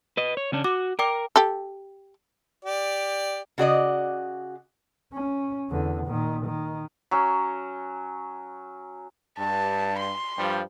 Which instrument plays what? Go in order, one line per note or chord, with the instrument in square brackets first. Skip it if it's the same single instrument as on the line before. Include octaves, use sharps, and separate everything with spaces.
[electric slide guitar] B4 D#5
C#5
C#3 C#4 D4
[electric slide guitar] F#4 [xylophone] D6
[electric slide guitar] A#4 [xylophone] D5 G5 D6
[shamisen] G4 A4
[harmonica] G4 D5
[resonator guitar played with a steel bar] C#3 F#4 D5 D#5
[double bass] C#4
E2 D3
A#2 D#3
D#3
[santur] F#3 C#4
[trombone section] G2 [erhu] A5
[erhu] C6
[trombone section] G2 F3 G3